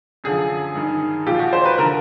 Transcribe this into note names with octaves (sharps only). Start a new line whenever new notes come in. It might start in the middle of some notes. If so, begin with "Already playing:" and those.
F#2 D3 F3 G#4
G2 D#3
A#2 F3 G4
F#4
C5
B4
D3 F3 A#4